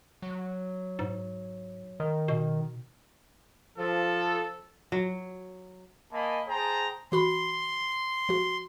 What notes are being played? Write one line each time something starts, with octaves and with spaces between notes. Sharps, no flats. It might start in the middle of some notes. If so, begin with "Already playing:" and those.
F#3
G#2
D#3
B2
F3 A4
F#3
A#3 D#5 G#5 A5 B5
G#4 C5 G5 A5 A#5
E3 F#4 B5 C6
F3 F#4